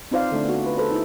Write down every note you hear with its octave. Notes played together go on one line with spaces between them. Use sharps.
C4 D#4 F4 C5 D5 F5
D3 A3 D4
B3 D#4 F#4
F4 B4
G#4 A4 B4 C5
D#4 E4